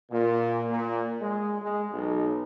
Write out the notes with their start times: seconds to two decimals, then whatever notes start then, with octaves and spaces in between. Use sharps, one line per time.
0.11 A#2
0.69 A#2
1.21 G#3
1.62 G#3
1.92 B1